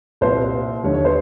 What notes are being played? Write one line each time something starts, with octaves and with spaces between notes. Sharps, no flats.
C2 A#2 G3 C5
D#2 D3 G3 C#5
C#5
C5